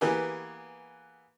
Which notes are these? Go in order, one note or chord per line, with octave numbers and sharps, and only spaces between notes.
E3 A#3 B3 G4 G#4